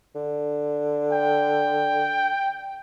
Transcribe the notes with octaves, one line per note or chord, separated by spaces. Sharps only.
D3
G5